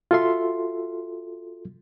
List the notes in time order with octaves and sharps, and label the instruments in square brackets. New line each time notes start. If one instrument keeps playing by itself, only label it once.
[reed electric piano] F4 F#4 A4 E5 C6